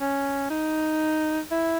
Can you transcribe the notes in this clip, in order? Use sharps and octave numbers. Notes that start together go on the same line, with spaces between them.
C#4
D#4
E4